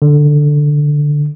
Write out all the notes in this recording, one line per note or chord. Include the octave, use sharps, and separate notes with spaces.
D3